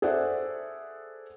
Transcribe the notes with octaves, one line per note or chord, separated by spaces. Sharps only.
G#4 A4 C5 D5 E5 F#5